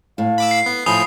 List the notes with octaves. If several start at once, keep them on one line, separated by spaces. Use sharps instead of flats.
A2 F5
B5 D6 E6
C7
B3
A2 F3 G#5 B5 D#6 G6